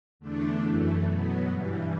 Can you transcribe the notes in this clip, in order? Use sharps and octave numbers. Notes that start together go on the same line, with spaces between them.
E2 D3 A3 D4
F#2 E3 A3
B2 F#3 B3
G2 E3 G3